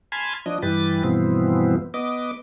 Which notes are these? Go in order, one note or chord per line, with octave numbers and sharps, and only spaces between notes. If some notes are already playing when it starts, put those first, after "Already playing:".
G#5 A5 B5 C6 F6 G#6
F3 D4 D#5
G2 E3 G4 B4 A6
G2 B2 E3 F3 B3 C4
B3 D#5 D6